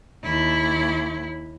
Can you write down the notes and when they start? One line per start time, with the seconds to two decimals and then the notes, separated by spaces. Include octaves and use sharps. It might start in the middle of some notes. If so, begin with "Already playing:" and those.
0.24 D#2 E4